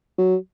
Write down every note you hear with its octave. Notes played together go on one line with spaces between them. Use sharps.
F#3